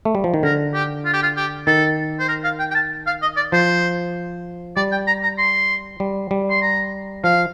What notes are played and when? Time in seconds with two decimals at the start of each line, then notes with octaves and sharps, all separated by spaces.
0.05 A3
0.15 G3
0.24 F3
0.34 D#3
0.43 D3 A#4
0.74 G4
1.05 F4
1.13 G4
1.23 F4
1.37 G4
1.67 D#3 A4
2.20 C5
2.28 A#4
2.44 F5
2.59 G5
2.71 G5
2.75 A5
3.07 F5
3.22 D#5
3.37 D5
3.52 F3 C5
4.76 G3 D5
4.92 G5
5.07 A#5
5.23 A#5
5.38 C6
6.00 G3
6.31 G3
6.50 C6
6.62 A#5
7.24 F3 F5